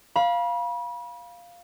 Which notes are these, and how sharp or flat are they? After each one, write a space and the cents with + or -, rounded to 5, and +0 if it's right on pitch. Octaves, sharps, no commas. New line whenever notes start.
F5 +0 B5 -35